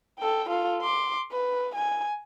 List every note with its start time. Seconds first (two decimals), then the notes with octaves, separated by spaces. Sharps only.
0.19 A4 G5
0.49 F4 A4
0.81 C6 D6
1.31 B4
1.75 G#5